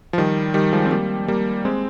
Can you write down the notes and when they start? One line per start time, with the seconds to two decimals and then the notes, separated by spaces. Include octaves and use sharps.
0.13 F3
0.18 D#3 G3
0.54 D#3 G3
0.73 F3 G#3
0.86 C4
0.91 G3 A#3
1.28 G3 A#3
1.65 G#3 C4